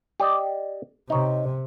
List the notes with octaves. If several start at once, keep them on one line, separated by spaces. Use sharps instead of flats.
G4 D5 D#5
C3 D#4 C#5